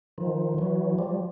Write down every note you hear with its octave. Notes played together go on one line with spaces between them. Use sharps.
D#3 F3
E3 F#3
F3 G3